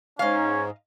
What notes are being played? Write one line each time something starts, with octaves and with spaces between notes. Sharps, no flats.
G#2 C#4 D#5 F5